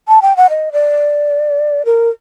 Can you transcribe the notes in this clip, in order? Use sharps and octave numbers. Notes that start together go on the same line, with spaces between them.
A5
G5
F#5
D#5
D5
A#4